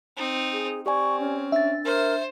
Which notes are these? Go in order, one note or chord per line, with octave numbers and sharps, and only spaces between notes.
C4 D#4
G#4
C4 G4 D5 G#5 C#6
C#4
D4 E5 A6
A#4 C5